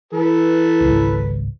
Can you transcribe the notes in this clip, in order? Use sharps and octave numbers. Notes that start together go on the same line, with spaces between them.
E3 A4 B4
G#1 C#2